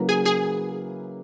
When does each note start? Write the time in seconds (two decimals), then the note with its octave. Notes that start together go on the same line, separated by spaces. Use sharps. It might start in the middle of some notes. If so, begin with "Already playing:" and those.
Already playing: C#3 F#3 A#3 E4 B4
0.09 G#4 G#5
0.25 G#4 G#5